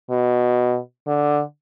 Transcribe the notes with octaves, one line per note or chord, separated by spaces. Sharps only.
B2
D3